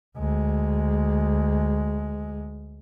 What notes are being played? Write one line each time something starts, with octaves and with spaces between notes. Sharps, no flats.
D2 G#3